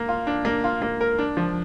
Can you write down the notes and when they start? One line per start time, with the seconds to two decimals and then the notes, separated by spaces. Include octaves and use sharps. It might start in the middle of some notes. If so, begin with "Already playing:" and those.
Already playing: A#3
0.09 F4
0.27 D4
0.45 A#3
0.64 F4
0.82 A#3
1.01 A#4
1.18 D4
1.37 F3